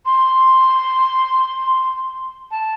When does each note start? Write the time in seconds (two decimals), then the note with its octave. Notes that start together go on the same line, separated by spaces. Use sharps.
0.06 C6
2.51 A5